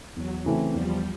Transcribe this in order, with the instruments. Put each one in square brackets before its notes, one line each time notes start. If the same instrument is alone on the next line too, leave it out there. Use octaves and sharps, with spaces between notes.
[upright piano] E2 [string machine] F#3
[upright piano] C#3 E3 A3 C4
[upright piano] E2 [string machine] F3 G3